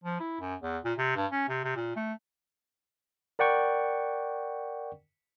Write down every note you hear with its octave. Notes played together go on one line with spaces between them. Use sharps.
F3
E4
F#2
E2
A#2
C3
G2
C#4
C3
C3
A#2
A3
A#4 D5 F#5 G5 C#6